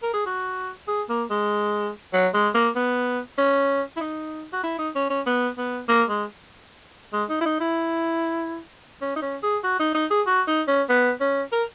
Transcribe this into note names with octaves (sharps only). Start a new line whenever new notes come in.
A#4
G#4
F#4
G#4
A#3
G#3
F#3
G#3
A#3
B3
C#4
E4
D#4
F#4
E4
D#4
C#4
C#4
B3
B3
A#3
G#3
G#3
D#4
E4
D#4
E4
C#4
D#4
C#4
G#4
F#4
D#4
D#4
G#4
F#4
D#4
C#4
B3
C#4
A#4